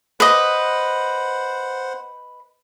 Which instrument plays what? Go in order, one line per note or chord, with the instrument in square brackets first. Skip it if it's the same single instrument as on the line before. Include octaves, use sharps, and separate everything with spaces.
[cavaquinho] B4 D#5 [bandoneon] C5 F#5